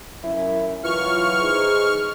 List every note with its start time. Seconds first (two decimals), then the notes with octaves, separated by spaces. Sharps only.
0.23 F#2 E4
0.84 E3 F#3 F4 C#6 F6
1.40 D#4 G#4 C5